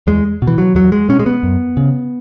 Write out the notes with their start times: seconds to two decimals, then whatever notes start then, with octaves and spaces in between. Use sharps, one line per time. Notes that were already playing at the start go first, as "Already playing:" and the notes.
0.07 E2 G#3
0.42 B2
0.47 E3
0.58 F#3
0.75 E2 F#3
0.92 G#3
1.09 B2 C#4
1.19 G#3
1.26 B3
1.43 F#2
1.77 C#3